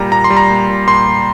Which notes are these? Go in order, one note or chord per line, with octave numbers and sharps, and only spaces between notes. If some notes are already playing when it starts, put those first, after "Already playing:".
Already playing: A#2 G3 A#5
A#2 A#5
C6
G3
A#5
A#2
A#2
A#2 C6
A#2